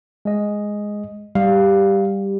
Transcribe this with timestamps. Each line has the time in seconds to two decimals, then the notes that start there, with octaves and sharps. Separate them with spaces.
0.25 G#3 D#5
1.35 G3 F5